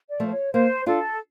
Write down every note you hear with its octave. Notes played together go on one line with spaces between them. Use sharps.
D5
F3 A3
C5
C#5
A#3 C5
D4 F4 A4